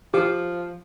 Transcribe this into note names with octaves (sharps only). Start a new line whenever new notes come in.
F3 G4